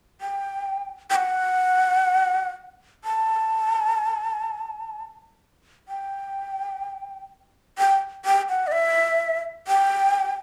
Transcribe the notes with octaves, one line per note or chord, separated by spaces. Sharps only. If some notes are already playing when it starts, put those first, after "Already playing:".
G5
G5
F#5
A5
G5
G5
G5
F#5
D5
E5
G5